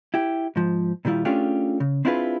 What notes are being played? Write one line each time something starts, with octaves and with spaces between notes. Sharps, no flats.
E4 G4
G#2 F3
A#2 D#3 G3 E4 F4
A3 C#4 D4 F4 G4 G#4
C#3
C4 D4 E4 F4 G#4 B4